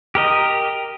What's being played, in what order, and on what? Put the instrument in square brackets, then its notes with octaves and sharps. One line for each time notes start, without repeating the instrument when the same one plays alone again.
[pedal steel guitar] G4 A#4 D#5